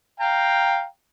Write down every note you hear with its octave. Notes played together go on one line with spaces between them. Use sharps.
F5 G5 A#5